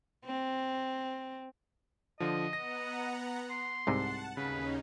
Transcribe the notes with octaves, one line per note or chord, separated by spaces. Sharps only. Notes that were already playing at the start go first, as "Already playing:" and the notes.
C4
D3 F3 D#5
B3 F#5 A#5 A#6
C6
C2 G#2 C3 F#5 A5
D#2 C#3 C#4 D#4 B4